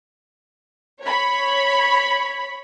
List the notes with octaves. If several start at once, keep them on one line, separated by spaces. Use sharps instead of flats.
C#5 B5